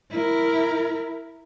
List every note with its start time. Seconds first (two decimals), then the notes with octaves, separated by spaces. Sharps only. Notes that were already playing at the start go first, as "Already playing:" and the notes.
0.11 E4 A#4